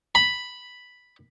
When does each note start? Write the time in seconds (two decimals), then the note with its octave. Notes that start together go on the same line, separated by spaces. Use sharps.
0.15 B5